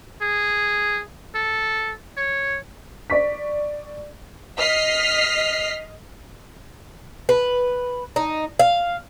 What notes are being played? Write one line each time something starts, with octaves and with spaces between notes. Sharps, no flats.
G#4
A4
C#5
D5 C#6 B6
D#5 F6 B6 C7
B4
D#4
F5